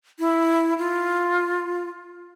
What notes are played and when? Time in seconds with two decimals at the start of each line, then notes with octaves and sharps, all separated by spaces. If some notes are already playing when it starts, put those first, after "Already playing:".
0.19 E4
0.78 F4